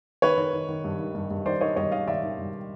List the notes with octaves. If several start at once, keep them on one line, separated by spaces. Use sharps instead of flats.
D#3 B4 C#5
D#3
D#3
D#3
G2
D#3
G2
G2
D#3 C5 D5
D#3 C#5 D#5
G2 C#5 D#5
D#3 D#5 F5
D#3 D5 E5
D#3
G2